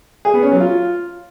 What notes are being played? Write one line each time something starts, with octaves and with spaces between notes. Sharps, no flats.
G#4
B3
C#4
F#3
F4